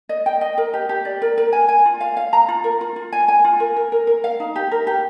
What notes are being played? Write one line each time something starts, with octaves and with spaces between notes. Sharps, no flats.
D#5
G5
D#5
A#4
G4
G4
D5
A#4
A#4
G#5
G#5
F4
F5
F5
A#5
F4
A#4
F4
F4
G#5
G#5
F4
A#4
A#4
A#4
A#4
F5
D#4
G4
A#4
G4